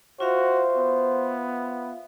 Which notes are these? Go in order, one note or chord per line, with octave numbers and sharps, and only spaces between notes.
F4 F#4 C5 E5 F5
B3